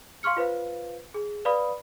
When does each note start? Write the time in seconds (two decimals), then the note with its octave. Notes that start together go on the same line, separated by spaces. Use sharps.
0.23 F5 C6 C#6 F6 C#7
0.37 F4 B4 C5 F5
1.14 G#4
1.45 B4 D5 F5 B5 D#6